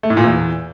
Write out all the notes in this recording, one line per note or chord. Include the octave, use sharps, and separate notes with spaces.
A3
A2
A#2
E2